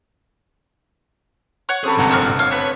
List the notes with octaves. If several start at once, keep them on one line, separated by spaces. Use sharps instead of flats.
C#5 F#5 C#6
C4 C#4 G#4 A4 B5
G1 G#2 C3 F#5 A#5
C4 C5 D5 C#6 F6
C#5 F5
A3 B4